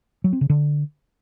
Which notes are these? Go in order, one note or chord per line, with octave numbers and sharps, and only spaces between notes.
F#3
C4
C#3
D3